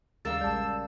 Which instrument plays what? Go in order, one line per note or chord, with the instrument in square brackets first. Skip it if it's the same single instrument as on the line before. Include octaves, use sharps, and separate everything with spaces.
[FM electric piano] D#2 [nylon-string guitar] C#3 G3 A#4 [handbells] F5 A6 [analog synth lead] E6
[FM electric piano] A#1 G#3 D5 [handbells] A5 G6